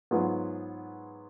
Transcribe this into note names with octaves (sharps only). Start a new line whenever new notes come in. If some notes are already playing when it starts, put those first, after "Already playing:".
G#2 F#3 B3 F4 G#4